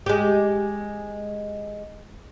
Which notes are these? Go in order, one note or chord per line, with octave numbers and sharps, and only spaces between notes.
G#3 G4